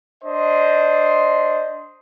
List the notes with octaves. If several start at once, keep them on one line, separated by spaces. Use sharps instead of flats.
D4 C5 D#5